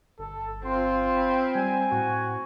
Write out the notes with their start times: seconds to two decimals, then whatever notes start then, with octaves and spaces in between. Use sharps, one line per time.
0.19 G1 A4
0.65 C4 F4 C6
1.16 B5
1.55 G3 G#5
1.92 A2 F#4